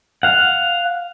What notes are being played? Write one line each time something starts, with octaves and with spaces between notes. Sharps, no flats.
F5 F#5